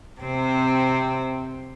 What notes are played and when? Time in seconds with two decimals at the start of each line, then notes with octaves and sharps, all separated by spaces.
0.21 C3 C4